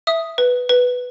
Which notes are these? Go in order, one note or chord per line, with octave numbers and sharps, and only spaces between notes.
E5 D#6
B4
B4